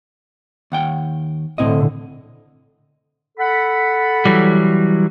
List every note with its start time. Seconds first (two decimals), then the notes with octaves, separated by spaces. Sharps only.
0.72 D#2 F#5 G5
1.58 A2 D3 C4 E4 D#5
3.38 A4 F#5 B5
4.25 E3 F#3 G3